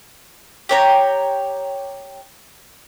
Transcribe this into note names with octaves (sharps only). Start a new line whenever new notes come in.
G4 C#5 A#5